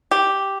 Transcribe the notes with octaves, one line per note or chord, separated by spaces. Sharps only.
G4